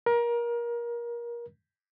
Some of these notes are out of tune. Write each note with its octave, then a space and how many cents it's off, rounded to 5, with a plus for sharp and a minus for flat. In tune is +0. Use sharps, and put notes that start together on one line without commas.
A#4 +25